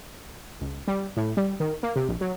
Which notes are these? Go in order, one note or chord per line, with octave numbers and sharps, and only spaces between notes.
C#2
G3
A2
G3
D#3
A#3
C3
A#1
F#3